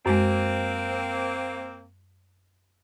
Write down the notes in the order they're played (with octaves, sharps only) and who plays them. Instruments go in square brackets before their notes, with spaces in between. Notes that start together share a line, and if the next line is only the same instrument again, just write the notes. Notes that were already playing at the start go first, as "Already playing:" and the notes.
[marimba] F#2 G#3 [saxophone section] A#3 C4